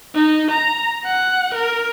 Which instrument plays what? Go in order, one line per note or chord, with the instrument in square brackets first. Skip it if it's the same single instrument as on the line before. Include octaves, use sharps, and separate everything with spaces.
[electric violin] D#4
A#5
F#5
A#4